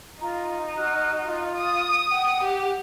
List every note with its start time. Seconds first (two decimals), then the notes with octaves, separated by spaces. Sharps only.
0.21 D#4 F4 A#5
0.77 F#4 F6 F#6
1.25 F4
1.56 D#6
2.11 F#5 G5
2.43 G4